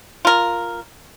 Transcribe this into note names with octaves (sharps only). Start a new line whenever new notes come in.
F4 A#4